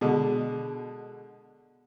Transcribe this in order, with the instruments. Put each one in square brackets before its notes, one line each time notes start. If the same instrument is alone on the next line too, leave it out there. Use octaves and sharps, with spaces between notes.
[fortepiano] B2 D3 G#3